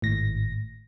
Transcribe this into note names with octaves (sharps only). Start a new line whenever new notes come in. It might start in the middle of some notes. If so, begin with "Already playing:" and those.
G#1 A2 A#6